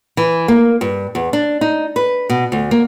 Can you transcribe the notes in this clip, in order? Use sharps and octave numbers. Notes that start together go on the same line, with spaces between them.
E3
A#3
G2
E2
D4
D#4
B4
B2
D2
A#3